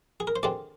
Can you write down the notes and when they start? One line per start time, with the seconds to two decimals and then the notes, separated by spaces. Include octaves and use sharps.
0.20 G#4
0.27 A#4
0.36 C5
0.43 D#2 D3 G#3 C4 D5